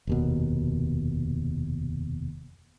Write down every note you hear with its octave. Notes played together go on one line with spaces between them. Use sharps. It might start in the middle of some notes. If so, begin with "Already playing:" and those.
F1 D#2 B2